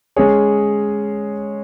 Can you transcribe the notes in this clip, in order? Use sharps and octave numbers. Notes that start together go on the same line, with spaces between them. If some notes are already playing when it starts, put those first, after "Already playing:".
G#3 C#4 G#4 C#5